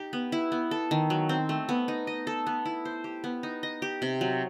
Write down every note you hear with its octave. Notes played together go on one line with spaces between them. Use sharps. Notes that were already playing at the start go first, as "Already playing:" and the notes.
Already playing: D#4 G4
B3
E4
B3
A4
D#3
F#3
C4
A3
B3
D#4
D#5
A4
B3
E4
C5
G4
B3
D#4
D#5
G4
C3
F#3